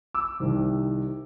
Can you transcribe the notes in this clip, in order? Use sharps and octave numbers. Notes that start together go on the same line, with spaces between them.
D6 E6
C2 C3 D#3